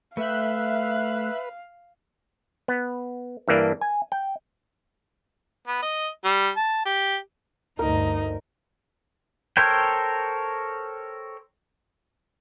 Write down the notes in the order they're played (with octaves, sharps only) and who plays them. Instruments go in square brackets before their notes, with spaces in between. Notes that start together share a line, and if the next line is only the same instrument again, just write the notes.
[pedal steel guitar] A3 G5 [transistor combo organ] B4 [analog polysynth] E5 F#6 [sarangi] F5
[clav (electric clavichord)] B3
G2 E3 A#3 D4
G#5
G5
[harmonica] B3
D#5
G3
A5
G4
[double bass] D2 G2 [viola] D#4 [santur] A#4
[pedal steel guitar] A4 A#4 C5 C#5 G5